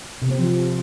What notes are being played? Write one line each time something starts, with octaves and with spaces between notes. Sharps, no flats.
C3
C4
F3